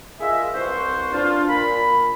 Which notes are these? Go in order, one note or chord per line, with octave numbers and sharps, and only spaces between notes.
F4 G#4 A#4 D#5 E5
C2 B4 C5 C#6
D4 F4
A#2 B5